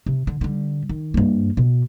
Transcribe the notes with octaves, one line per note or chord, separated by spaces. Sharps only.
C3
D3
D3 G3
D#3
G2 A#3
B2